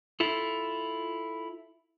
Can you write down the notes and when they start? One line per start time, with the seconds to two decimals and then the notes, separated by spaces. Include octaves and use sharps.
0.20 E4 F4 A4